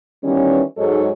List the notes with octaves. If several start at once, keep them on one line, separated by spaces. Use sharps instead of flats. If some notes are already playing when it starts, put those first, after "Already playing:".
D#3 E3 G3 B3 C#4
G#2 F#3 G#3 D#4 A4 C#5